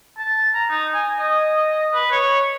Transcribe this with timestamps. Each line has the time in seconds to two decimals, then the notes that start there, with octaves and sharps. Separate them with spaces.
0.18 A5
0.54 A#5
0.70 D#4
0.94 G#5
1.19 D#5
1.95 B4
2.12 C#5